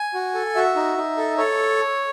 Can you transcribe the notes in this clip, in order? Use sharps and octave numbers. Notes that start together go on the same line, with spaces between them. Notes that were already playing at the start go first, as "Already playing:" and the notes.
Already playing: G#5
F#4
A4
F#4 E5
D#4
D#4
A4
A4 C#5